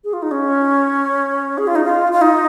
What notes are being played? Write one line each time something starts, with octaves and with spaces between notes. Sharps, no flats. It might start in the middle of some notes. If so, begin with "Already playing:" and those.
G#4
F4
D#4
C#4
G#4
F4
D#4
F4
F4
D#4